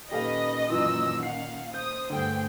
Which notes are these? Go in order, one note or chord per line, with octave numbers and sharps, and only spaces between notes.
A#2 D#3 C#4 G4 A4 B4 D#5 F5
F#2 E3 F4 E6
F5 F#5 C7
C5 D#6 G6
D2 G2 D3 G#4 G5